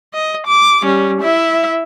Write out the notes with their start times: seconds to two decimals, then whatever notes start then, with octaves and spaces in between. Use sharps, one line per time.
0.14 D#5
0.47 D6
0.82 G3 C#4
1.20 E4 E5